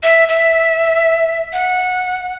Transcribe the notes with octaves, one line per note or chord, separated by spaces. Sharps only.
E5
E5
F#5